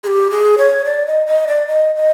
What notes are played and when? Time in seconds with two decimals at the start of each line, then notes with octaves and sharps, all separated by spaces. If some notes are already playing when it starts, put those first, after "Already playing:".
0.04 G#4
0.07 G4
0.30 G#4
0.58 C#5
0.85 D5
1.07 D#5
1.27 D#5
1.47 D5
1.67 D#5
1.96 D#5